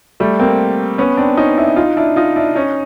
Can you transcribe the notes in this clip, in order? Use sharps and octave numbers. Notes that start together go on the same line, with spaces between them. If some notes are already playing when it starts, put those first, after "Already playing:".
G3 A3
A#3 C4
B3 C#4
C4 D4
C#4 D#4
D4 E4
D#4 F4
D4 E4
D#4 F4
D4 E4
C#4 D#4